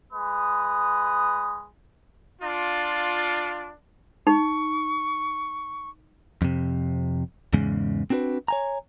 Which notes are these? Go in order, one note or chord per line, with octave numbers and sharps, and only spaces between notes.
G#3 B4 D#6
D4 F4
D#4 C#6
F2 C3
E2 G#2 C#3 G#3
C4 D4 F#4 A#4 B4
C#5 G#5 A#5